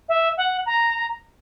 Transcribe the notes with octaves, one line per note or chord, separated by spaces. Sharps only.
E5
F#5
A#5